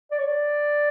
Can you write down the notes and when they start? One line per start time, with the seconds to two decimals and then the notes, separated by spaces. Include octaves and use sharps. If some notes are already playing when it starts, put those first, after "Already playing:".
0.11 D5
0.18 C#5
0.26 D5